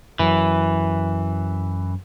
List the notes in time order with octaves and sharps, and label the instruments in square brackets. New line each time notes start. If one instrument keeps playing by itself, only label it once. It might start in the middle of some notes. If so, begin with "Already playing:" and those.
[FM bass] F#2 [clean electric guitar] E3